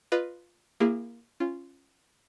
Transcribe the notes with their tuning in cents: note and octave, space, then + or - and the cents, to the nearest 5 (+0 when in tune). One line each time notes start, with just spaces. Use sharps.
F4 +0 B4 +0 D#5 -30
A#3 +5 E4 +30 G#4 -35
C#4 -15 F4 -15